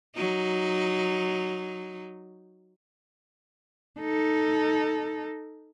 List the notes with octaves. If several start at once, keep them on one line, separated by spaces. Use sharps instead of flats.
F#3 D#4
D#4 A4